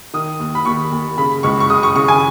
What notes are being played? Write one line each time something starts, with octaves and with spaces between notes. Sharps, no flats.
D#3 D#6
D#2
B5
D#2 C#6
D#2
C#3 B5
C#2 C#6
C#6
C#3 D#6
C#6
C#3 C#6
G#5